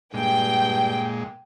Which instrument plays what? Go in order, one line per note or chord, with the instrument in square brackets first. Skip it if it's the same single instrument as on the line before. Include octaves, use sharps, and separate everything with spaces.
[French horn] G2 [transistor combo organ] A#2 G#3 [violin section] G5